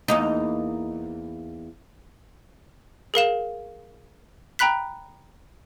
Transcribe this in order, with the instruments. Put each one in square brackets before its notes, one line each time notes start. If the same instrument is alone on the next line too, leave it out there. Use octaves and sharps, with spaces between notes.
[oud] E2 A#3 D#4
[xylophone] G#4 A#4 F5 E7
G5 A#5 B5 F#6 B6